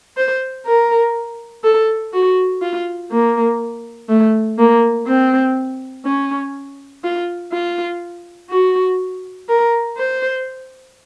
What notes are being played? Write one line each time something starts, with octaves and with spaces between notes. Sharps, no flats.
C5
A#4
A4
F#4
F4
A#3
A3
A#3
C4
C#4
F4
F4
F#4
A#4
C5